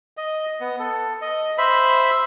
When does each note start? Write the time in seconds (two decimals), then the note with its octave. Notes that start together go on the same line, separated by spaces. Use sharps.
0.17 D#5
0.60 B3
0.79 A4
1.21 D#5
1.58 C5 E5 B5